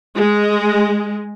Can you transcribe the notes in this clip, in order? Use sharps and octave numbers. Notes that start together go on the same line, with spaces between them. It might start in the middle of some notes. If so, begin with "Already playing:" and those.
G#3